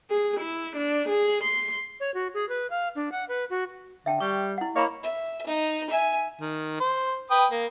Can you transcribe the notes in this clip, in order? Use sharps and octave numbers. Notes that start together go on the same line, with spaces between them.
G#4
E4
D4
G#4
C6
C#5
F#4
G#4
B4
F5
D4
F#5
B4
F#4
D3 E5 G5 A5
G3 C#6
E4 F#5
A#3 E4 C#5 D#5 A#5 B5
E5
D#4
E5 G#5
D#3
C5
B4 G5 D#6
A#3